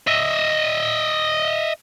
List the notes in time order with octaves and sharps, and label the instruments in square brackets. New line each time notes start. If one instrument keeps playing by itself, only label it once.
[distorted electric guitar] D#5 E5